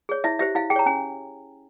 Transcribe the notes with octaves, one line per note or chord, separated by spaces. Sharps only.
G#4 C#5
E4 E5
G4 C5 E5
E4 F5
G#4 G5
C#5 A#5
C#4 G#5